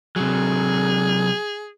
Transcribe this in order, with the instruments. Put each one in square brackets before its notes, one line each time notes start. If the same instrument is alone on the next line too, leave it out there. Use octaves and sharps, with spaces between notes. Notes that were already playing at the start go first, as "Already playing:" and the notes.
[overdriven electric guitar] C3 F#3 [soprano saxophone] G#4